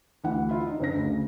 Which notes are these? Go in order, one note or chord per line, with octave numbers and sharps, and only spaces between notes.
D2 E3 F#5
E4 F4
D4 D#4
F#1 D3 A#6
D2 C#3